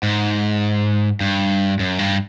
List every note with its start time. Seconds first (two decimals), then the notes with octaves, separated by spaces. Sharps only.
0.03 G#2
1.20 G2
1.79 F#2
1.99 G2